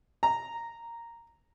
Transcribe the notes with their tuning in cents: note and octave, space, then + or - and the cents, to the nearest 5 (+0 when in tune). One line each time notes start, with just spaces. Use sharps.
A#5 -5